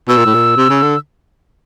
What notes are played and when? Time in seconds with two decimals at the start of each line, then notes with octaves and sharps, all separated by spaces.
0.08 B2 E6
0.17 A#2
0.26 A2
0.34 A#2
0.57 C3
0.69 C#3
0.82 D3